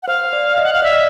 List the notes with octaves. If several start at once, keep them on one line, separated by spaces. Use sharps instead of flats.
F#5
C5 F5
D5
D#5
F#5
F5
D5 E5
D#5